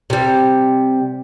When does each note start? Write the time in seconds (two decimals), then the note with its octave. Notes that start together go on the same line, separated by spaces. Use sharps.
0.10 C3 G3